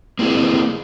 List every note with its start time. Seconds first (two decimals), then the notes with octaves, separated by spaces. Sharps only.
0.19 A#3 C4 E4 G#4 D5